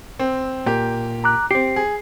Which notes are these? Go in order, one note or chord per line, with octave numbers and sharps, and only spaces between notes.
C4
A#2 A#3 G4
A#5 D6 F#6
C4 G4 C7
G#4